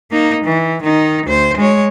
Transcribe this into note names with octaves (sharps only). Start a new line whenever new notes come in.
A#3 D#4
E3
D#3 D#4
D2 C5
G#3 C#5